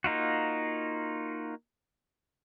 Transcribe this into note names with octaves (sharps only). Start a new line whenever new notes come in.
A#3 D#4 F4 F#4